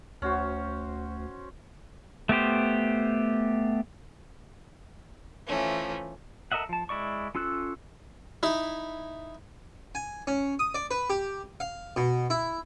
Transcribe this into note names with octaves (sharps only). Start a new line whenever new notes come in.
D2 C#4 F#4 C5
A3 B3 G4 C5
E3 F3 A3 C#4
A4 A#4 D#5 E5 F#5
F3 A5
G#3 E4 D5 C#6
C#4 F4 A4 E6 F#6
D#4 E4
G#5
C#4
D#6
D5
B4
G4
F5
B2
E4